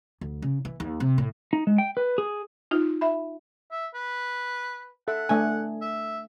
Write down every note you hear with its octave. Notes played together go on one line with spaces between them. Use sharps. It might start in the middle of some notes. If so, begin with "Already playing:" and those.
D2
C#3
E3
D#2
C3
A2
D#4
G#3
G5
B4
G#4
D#4 F4
E5 B5
E5
B4
A4 E5 F#5
A3 D4 G#5
E5